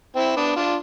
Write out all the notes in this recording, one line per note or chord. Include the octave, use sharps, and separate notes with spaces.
C4 E4
B3 D4
D4 F4